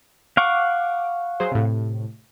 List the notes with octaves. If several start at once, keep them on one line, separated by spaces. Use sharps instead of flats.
F5 F#5 C#6 D6
F#3 G#4 C5
A2 C3